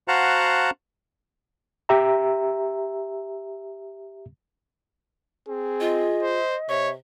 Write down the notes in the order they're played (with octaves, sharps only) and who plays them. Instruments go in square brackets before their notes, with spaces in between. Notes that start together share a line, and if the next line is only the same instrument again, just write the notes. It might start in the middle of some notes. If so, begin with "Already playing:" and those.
[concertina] F#4 C5 F5 F#5 A5 A#5
[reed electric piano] G4 E5 A#5
[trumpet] C4 [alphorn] G#4
[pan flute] F4 [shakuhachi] D#5
[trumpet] C5
[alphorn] C3 [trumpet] C#5 [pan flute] E5